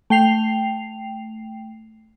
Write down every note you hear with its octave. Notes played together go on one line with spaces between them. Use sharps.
A3 G5 C7 F7